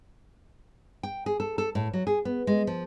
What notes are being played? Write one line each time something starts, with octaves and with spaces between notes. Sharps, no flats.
G5
G#4
A4
A4
A2
F#3
G#4
B3
G#3
F3